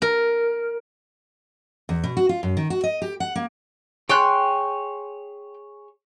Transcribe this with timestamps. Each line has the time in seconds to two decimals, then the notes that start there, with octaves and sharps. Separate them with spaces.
0.02 A#4
1.89 E2
2.04 B2
2.17 F#4
2.29 F4
2.43 F#2
2.57 D#3
2.70 F#4
2.84 D#5
3.02 G4
3.20 F#5
3.36 A#3
4.09 G#4 C#5 G5 C6 F#6